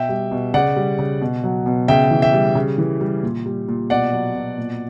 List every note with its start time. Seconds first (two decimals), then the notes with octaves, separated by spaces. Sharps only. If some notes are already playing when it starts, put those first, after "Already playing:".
Already playing: B2 E5 G5
0.09 G3
0.31 B2
0.54 C#3 D5 F#5
0.76 G3
0.99 C#3
1.21 B2
1.44 F#3
1.66 B2
1.88 C#3 E5 G5
2.11 E3
2.22 E5 G5
2.33 G3
2.55 C#3
2.78 E3
3.01 G3
3.23 A#2
3.46 G3
3.68 A#2
3.90 B2 D5 F#5
4.13 F#3
4.35 B2
4.58 A#2